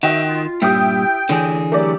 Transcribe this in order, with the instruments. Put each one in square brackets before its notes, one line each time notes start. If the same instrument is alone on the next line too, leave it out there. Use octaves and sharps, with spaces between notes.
[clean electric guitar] D#3 [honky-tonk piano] F#4 D#5 G5 [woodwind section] E5
[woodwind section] F4
[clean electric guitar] G2 A#2 [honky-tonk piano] E4 G4 D#6 [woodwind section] G5
[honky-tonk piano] A1 [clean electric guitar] D3 E3 G#4
[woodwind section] D#3 F#3 G4 [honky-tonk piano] A3 D5